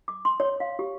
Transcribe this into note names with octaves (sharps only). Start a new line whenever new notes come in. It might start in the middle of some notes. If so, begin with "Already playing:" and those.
D6
C6
C#5
F5
G4